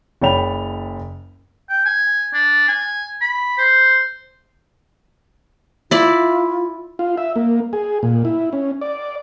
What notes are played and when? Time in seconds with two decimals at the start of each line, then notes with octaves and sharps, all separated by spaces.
0.22 F#1 C#5 D5 G5 B5 F7
1.69 G5
1.86 G#5
2.33 D4
2.68 G#5
3.21 B5
3.58 C5
5.91 E4 F4 D5
6.99 F4
7.18 E5
7.36 A#3
7.73 G#4
8.03 A#2
8.25 E4
8.53 C#4
8.81 D5